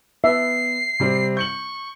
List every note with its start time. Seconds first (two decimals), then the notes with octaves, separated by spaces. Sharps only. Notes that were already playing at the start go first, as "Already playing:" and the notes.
0.24 B3 E5 C7
1.00 C3 G3 C4
1.37 C#6 G6 C#7 F#7